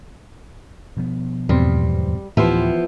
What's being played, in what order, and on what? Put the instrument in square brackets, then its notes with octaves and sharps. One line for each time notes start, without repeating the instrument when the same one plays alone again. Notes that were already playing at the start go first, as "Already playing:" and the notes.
[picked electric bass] B2 F3 B3
[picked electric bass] D1 G#2 F3 [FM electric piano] E2 B2 C4 [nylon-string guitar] G3
[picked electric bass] D2 A2 [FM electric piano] E3 G4 C5 [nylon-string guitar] F3 B3 E4